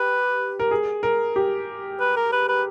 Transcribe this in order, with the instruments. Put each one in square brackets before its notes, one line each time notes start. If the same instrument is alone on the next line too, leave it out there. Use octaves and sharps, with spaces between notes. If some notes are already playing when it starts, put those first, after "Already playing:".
Already playing: [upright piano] G4 [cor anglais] B4
[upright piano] A#4
G#4
A#4
G4
[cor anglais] B4
A#4
B4
B4